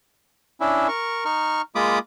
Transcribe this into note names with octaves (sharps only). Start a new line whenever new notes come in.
C#4 D4 E4
A#4 C#6
D#4 C#6 F6
G#3 A#3 F4 B5 D6 D#6